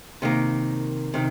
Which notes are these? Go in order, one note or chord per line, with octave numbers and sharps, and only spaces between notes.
C3 D#3 A#3
C3 D#3